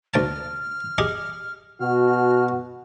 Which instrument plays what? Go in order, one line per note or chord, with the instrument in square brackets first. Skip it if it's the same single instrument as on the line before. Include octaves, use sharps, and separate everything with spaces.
[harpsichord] D2 G5 A5 [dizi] F6
[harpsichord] G4 G#4 D#5
[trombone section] B2 F#4 [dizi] F6